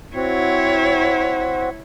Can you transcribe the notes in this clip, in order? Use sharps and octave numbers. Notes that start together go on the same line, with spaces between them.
C4 E4 F#4 C#5